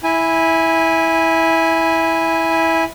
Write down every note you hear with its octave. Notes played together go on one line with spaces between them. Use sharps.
E4 G#5